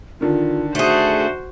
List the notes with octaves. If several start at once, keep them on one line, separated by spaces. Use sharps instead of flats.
D3 D#3 F4
A3 F#4 G#4 C5 E5